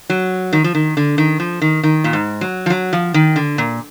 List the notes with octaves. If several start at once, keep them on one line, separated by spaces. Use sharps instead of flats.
F#3
D#3
F3
D#3
D3
D#3
F3
D#3
D#3
A#2
G#2
F#3
F3
F#3
F3
D#3
D3
A#2